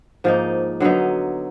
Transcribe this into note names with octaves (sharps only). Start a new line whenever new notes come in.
G#2 F3 A#3 D#4
D3 F#3 B3 D#4